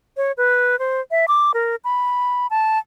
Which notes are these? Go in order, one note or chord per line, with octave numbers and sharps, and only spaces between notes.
C#5
B4
C5
E5
D6
A#4
B5
A5